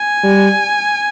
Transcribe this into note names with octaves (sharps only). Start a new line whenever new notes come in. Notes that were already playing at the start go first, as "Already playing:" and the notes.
Already playing: G#5
G3